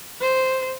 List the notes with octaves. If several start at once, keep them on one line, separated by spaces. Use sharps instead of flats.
C5